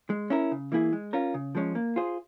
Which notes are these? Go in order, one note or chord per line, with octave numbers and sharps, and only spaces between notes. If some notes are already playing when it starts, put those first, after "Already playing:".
G#3
C#4 E4 A#4
C#3
E3 A#3 E4 G#4
G#3
C#4 F4 A#4
C#3
F3 G#3 C#4
A#3
F4 G#4 C5